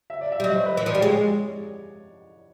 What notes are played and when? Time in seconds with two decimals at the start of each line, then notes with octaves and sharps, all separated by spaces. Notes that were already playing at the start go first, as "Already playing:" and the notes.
0.10 E5
0.21 D5
0.32 E5
0.40 G3
0.43 F#3 D#5
0.55 C5
0.66 B4
0.77 E3
0.86 F3 D5
0.95 G3
1.00 G#3 C#5